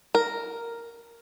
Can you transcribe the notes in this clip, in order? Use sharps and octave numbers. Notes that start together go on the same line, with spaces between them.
A#4